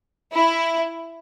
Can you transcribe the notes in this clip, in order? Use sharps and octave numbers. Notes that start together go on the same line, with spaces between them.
E4